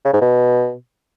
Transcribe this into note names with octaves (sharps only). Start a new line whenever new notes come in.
C#3
G#2
B2